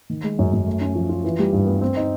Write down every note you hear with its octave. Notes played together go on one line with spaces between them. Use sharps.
D#3
G#3
F#2
F#2
A3
C#4
F3
F4
E3
G3
G2
B3
C4
D#4